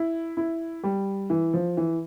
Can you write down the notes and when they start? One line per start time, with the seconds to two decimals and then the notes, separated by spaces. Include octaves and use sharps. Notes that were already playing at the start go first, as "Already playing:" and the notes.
Already playing: E4
0.37 E4
0.83 G3
1.30 E3
1.54 F3
1.77 E3